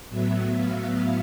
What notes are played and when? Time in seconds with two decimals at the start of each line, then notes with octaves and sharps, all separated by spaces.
0.10 A2 F#3 B3 E5
0.55 F5